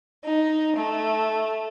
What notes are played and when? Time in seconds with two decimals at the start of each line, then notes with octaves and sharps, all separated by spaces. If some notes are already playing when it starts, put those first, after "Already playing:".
0.24 D#4
0.76 A3